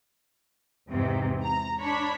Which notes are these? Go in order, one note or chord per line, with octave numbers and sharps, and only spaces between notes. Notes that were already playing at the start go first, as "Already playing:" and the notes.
E2 G#2 C3
A#5
D4 C#5 B5